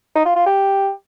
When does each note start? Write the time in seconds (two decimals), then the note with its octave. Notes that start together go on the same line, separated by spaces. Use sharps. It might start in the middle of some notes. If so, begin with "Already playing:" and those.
0.15 D#4
0.26 F4
0.36 F4
0.46 G4